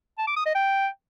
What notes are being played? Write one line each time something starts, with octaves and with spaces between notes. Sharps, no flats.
A5
D6
D#6
D#5
G5